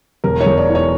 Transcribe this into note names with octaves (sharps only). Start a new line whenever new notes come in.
E1 A#4
C#5
E1
D5
E3
C#5